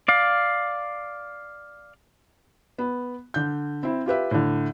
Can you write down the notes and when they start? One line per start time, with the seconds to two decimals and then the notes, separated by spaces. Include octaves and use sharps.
0.08 D5 F5
2.78 B3
3.34 D3 G6
3.83 C4 E4
4.06 F4 G4 B4 E5
4.31 A2 D3